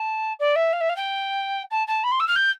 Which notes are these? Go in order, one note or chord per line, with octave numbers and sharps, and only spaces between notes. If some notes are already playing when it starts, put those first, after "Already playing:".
Already playing: A5
D5
E5
F5
E5
F5
G5
A5
A5
B5
C6
E6
F6
G6